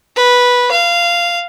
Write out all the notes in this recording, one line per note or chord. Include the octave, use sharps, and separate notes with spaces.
B4
F5